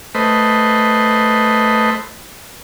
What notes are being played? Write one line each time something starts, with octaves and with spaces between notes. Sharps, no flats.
A3 B4 C5 D#5